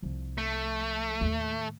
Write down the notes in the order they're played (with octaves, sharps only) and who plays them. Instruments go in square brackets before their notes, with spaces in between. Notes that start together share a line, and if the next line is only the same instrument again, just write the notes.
[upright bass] C2 F3
[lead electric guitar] A3
[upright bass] D#2 A2